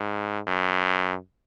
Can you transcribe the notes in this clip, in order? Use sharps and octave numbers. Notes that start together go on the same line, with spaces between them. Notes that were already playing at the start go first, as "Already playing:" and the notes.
Already playing: G#2
F#2